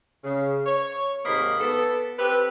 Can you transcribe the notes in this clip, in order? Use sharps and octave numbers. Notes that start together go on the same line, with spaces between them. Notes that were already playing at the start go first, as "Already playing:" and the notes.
C#3
C#5
G#2 C3 D#3 A#3 D#5 B5
B3 A4
C4 G4 A4 B4